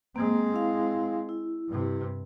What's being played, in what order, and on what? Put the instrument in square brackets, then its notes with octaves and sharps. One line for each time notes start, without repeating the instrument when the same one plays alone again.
[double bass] G#3 C4 [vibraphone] A#3
[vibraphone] E4 F5
E4
[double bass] G2 C3